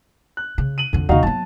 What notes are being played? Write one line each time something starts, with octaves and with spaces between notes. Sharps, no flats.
F#6
C#3
D#7 F#7
F2 D3
D#2 C#3 D#4 F#4 F5
F#3 B3 A5